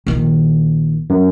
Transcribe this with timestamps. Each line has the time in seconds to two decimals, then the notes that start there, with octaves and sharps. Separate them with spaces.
0.07 A#1 D#3
1.10 F#2